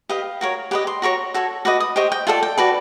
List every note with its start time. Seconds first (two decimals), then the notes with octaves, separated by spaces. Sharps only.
0.09 G4 B4 D#5 F5
0.41 F#4 A#4 C#5
0.71 G4 B4 D#5 F#5
0.87 C6
1.02 F#4 A#4 C#5 C#6
1.34 F#4 A4 C#5
1.65 F#4 B4 D#5 D6
1.80 D#6
1.96 G4 C5 D#5 C#6
2.12 G5
2.27 F4 A4 D5 F#5
2.43 G5
2.58 F#4 B4 D5 A5